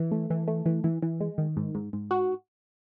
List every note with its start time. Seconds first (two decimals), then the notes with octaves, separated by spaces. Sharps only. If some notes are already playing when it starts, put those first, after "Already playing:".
Already playing: E3
0.12 A3
0.30 E3
0.48 A3
0.66 E3
0.84 E3
1.02 E3
1.21 G#3
1.38 D#3
1.57 G#2
1.75 G#2
1.93 G#2
2.11 F#4